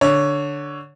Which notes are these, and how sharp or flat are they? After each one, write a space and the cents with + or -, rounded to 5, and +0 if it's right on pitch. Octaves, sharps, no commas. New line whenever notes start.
D3 +0 C#5 +10